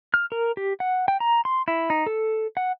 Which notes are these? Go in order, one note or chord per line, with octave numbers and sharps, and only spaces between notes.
F6
A#4
G4
F#5
G5
A#5
C6
E4
D#4
A4
F#5